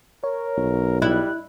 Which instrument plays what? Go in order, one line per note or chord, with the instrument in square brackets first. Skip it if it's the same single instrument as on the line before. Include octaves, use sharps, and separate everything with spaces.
[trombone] A#4 [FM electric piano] C#5
[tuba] B1
[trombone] G3 [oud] E4 [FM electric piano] F#6